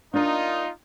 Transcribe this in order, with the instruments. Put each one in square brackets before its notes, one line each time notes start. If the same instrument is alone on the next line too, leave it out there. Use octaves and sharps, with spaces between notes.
[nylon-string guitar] A#3 D4 [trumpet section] D#4 F4